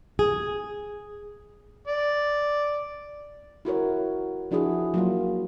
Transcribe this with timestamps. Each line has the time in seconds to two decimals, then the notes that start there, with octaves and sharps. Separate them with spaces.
0.19 G#4
1.88 D5
3.65 E4 F#4 A#4 C#5
4.51 F3 D4 E4 F#4 G#4
4.94 F#3 A#3 F4